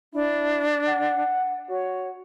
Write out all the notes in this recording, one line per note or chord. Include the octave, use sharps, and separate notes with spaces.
D4 E4
F#5
F#4 C#5